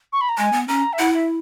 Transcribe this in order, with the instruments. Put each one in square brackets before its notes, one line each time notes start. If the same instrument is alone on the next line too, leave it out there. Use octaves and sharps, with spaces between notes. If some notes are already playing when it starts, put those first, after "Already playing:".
[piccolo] C#6
B5
A#5
[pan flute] G#3 [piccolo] G#5
[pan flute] B3
[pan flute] C#4 [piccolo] A#5
[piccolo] E5
[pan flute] E4 [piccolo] F#5
[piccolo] E5